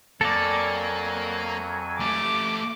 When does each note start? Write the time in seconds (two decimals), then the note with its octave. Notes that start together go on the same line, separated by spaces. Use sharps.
0.21 F2 F#3 A#3 A4 D5 G#5
2.00 A3 G4 D6